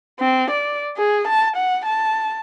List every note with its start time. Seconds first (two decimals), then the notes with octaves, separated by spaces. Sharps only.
0.20 C4
0.51 D5
0.98 G#4
1.28 A5
1.56 F#5
1.86 A5